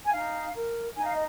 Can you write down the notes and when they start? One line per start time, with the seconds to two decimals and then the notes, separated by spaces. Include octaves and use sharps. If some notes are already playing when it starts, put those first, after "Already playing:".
0.05 G#5
0.12 D#4 F5
0.54 A#4
0.96 D#4 G#5
1.04 F5
1.13 D#5